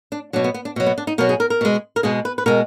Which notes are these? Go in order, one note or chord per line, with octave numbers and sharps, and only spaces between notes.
D4
B2 F#3 D4
B3
B3
D4
B2 F#3
B3
D4
D#4
B2 F#3 A#4
G#4
A#4
A#4
B2 G#3
A#4
B2 G#3 G#4
B4
B4
B2 G#3 A#4